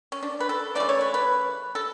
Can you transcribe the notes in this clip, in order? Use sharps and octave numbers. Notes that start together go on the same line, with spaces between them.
C#4
D4
B4
A4
C#3 E3 A3 D5
C#5
B4
B4
A4